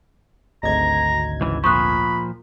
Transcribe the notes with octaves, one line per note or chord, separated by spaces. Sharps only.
G#1 D2 D#5 A#5 G#6
C#2 G#2 E3
A#2 F3 B5 C#6 D#6 F#6